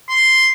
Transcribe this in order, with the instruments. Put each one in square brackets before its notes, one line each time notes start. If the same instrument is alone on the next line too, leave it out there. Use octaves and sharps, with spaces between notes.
[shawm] C6